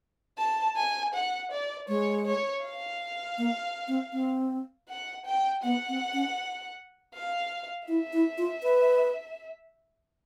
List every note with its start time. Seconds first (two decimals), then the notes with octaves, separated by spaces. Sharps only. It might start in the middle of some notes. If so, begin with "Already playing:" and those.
0.38 A5
0.76 G#5
1.14 F#5
1.51 D5
1.88 G#3 C#5
2.26 C#5
2.64 F5
3.38 A#3
3.88 C4
4.13 C4
4.88 F#5
5.26 G5
5.63 B3 F#5
5.89 C4
6.13 C#4
7.14 F5
7.88 E4 E5
8.13 E4
8.38 F4
8.63 B4